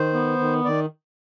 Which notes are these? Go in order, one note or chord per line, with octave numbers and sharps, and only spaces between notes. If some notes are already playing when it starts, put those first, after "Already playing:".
Already playing: D#3 C5
B3
D#3
D#3 D5